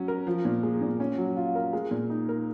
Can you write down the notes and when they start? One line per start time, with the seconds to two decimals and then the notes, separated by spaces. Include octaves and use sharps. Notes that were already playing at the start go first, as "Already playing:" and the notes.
Already playing: F#3 C#4 F#4
0.08 A#4
0.27 F3
0.45 A#2
0.63 G#3
0.82 A#2
1.00 C#4
1.18 F#3
1.37 F4
1.55 A#4
1.73 G#3
1.91 A#2
2.10 D#4
2.29 A#4